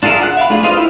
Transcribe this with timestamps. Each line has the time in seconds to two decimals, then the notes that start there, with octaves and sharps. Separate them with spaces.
0.03 D4 F4 G#4 A#4 E5
0.21 F#5 F#6
0.37 E5 F5 B5
0.50 A3 D4 F4 G#4
0.63 F4 B4 C5 D#5 F5
0.77 E4 G4 B4 E5